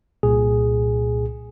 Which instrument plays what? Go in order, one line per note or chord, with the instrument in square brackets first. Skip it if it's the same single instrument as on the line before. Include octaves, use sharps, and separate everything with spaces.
[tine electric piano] C2 A#2 G#4